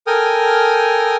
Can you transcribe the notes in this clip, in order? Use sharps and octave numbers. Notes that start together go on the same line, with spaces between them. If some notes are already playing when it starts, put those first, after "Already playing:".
A4 A#4 G5 G#5 D#6 F6